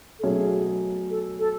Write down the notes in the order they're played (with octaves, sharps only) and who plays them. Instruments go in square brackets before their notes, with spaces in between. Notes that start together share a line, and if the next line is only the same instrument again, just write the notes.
[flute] A4
[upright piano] B2 F#3 A3 C#4 [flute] G#4
[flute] A4
A4